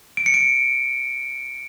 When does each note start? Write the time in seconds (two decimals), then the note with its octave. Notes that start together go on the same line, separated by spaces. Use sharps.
0.17 D7
0.26 C#7
0.34 D7